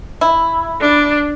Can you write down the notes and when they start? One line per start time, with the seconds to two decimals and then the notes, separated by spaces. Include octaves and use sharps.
0.21 E4
0.81 D4